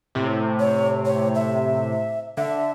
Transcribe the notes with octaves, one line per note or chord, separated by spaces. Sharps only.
A2 C3
C#5
C#5
E5
D3 E5